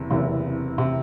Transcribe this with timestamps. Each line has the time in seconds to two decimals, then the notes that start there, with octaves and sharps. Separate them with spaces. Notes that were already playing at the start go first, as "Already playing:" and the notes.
Already playing: F#1 E2 C3
0.11 F#1 E2 C3
0.78 C3